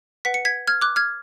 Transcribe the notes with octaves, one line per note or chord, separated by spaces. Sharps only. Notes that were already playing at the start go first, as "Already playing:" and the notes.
B4 F#5 B6
C#7
G#6 B6
F6 G#6
D6 F#6
F6 G#6